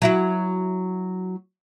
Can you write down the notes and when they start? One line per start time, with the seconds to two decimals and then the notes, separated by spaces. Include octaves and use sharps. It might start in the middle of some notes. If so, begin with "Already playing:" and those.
0.02 F#3 E4 F#4